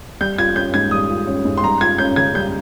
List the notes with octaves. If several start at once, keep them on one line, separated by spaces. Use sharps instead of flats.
G3 G6
F4 G#6
C#4 G6
G#2 G#6
G3 D#6
F4
C#4
G#2
C6
G3 A#5
F4 G#6
C#4 G6
C#3 G#6
G3 G6